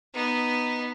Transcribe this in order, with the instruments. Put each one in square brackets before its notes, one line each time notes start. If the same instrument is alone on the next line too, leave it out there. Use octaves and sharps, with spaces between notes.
[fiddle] B3 D#4